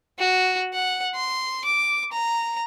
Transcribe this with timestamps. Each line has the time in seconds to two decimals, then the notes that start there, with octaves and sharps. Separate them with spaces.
0.19 F#4
0.74 F#5
1.15 C6
1.65 D6
2.12 A#5